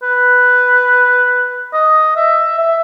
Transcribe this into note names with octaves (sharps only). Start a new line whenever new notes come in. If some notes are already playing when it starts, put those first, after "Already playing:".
B4
D#5
E5
E5